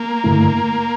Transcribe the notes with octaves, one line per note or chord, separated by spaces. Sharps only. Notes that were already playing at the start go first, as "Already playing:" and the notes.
Already playing: A#3
G2 D3 A3 E4